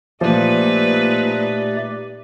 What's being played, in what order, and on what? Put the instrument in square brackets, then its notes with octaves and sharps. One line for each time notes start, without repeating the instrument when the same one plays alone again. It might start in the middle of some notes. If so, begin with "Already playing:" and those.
[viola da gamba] A#2 D#4 B4 [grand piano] F3 [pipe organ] A3 G4 D5